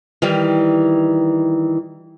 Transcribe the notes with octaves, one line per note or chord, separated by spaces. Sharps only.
D#3 E3 G3